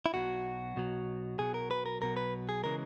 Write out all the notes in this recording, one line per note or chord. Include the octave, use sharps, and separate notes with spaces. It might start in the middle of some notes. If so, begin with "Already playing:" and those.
E4
B1 B2 F#3 F#4
B1 B2 F#3
B1 B2 F#3 G#4
A#4
B4
A#4
B1 B2 F#3 A#4
B4
G#4
C#3 E3 G#3 A#4